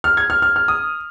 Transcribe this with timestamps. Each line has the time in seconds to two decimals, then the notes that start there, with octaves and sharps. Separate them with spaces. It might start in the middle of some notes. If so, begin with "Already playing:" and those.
0.04 F6
0.17 G#6
0.30 F6
0.42 F6
0.56 F6
0.68 D#6